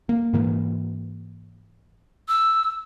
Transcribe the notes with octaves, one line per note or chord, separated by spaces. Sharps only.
A#3
G#2 E3 A#3
E6